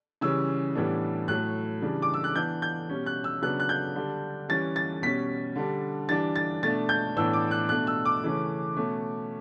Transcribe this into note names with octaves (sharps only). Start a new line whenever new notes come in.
C#3 E3 G3 C#4 E6
A2 E3 G3 B3 D4
A2 F#3 A3 F#6
C#3 E3 G3 D4
D6
E6
F#6
E3 B3 D4 G6
G6
B2 G3 C#4
F#6
E6
C#3 F#3 B3 D4 F#6
F#6
G6
D3 G3 D4
E3 G3 C#4 A6
A6
B2 G3 C#4 B6
D3 G3 D4
E3 G3 D4 A6
A6
B2 A3 D4 A6
G6
A2 E3 B3 D4 E6
D6
F#6
B2 A3 D4 F#6
E6
D6
C#3 E3 A3 C#4
B2 A3 C#4